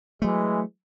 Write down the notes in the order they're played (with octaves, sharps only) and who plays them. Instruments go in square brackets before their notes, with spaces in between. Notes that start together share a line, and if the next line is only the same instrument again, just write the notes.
[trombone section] E3 G#3 [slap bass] F#3 A3